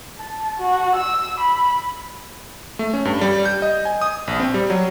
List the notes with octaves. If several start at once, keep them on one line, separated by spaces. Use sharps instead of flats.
A5
F#4
E6
B5
A3
C#4
G2
G3
G6
D#5
G#5
D#6
A#1
C4
G3
F#3